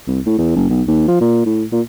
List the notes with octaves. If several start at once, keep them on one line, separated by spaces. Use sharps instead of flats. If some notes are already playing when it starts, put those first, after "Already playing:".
C2
A2
E2
F#1
B1
D#2
F3
A#2
A2
A#2